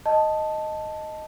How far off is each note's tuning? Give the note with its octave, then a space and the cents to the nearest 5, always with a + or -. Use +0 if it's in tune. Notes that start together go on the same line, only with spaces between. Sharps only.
D#5 +0 A5 +0